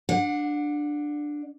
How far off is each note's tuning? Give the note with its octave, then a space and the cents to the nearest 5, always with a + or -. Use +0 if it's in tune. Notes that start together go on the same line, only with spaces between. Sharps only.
D4 +5 F#5 -30